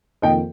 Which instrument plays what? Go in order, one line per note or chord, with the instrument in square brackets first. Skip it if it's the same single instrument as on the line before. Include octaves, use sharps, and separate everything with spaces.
[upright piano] F2 D#3 A#3 D#5 G5